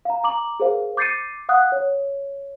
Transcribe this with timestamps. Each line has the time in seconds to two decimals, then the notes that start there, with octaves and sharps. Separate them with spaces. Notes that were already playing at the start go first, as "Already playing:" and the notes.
0.05 F5 A#5
0.24 A#5 D6 F#7
0.60 G#4 A#4 C5 F5
0.97 D6 G6 A6 C7 C#7 D#7
1.49 F5 F#5 D#6 F#6
1.72 C#5